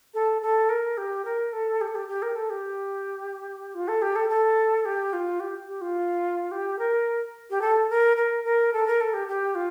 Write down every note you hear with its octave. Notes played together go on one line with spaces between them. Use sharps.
A4
A4
A#4
G4
A#4
A4
G4
A4
G4
G4
A#4
A4
G4
F4
A4
G4
A4
A4
G4
F4
G4
G4
F4
G4
A#4
G4
A4
A#4
A#4
A#4
A4
A#4
A4
G4
G4
F4